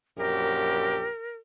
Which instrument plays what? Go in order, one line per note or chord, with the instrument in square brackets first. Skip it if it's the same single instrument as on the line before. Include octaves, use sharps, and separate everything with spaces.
[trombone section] A#1 F#2 G4 [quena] A#4